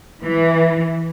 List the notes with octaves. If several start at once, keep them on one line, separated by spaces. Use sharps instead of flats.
E3